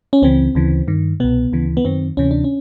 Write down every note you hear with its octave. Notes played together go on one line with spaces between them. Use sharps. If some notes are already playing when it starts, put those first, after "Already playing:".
C#4
C#2 C#3 E3 C4
D2 C#3 E3
G2 D#3
C2 B2 B3
D2 C#3 E3
B3
F#2 D#3 C4
D2 C3 E3 C#4
D4
C#4